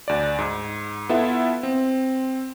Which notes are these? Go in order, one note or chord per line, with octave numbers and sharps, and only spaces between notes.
D2 D5
G#2
B3 E4 F4 A4 E5 F#5
C4